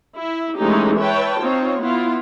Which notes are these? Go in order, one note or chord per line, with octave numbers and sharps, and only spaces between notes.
E4
E3 G#3 A3 C#4 D#4 G4
B4 C#5 E5 G5 A5
C4 D#4 F4 C#5
B3 E4 F4